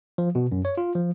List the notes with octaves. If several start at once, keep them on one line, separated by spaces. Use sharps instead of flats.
F3
B2
F#2
C#5
F4
F3